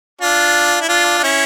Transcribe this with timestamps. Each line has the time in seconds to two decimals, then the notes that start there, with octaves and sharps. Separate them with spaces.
0.21 D4 F4
0.81 E4
0.89 D4 F4
1.18 D4
1.23 C#4 E4